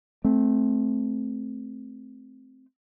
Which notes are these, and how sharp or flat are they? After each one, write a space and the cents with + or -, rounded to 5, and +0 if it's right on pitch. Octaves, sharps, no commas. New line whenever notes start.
A3 -15 C4 +0